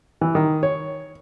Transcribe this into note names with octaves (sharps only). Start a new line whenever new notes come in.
E3
D#3
C#5